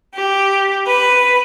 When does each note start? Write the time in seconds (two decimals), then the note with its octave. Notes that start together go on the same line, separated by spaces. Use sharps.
0.14 G4
0.87 B4